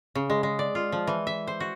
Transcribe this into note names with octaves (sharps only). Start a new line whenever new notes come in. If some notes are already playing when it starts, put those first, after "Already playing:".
C#3
G#3
G#3
D5
F4
F3
E3
E5
C5
F#4